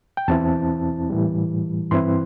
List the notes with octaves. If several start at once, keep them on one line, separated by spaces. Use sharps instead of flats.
G5
E2 E3 C4 E4 A5
A2 E3 G3
G2 E3 C4 E4 C6